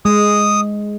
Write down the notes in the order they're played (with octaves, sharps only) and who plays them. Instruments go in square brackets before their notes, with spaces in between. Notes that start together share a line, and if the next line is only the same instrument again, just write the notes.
[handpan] G#3 [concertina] D#6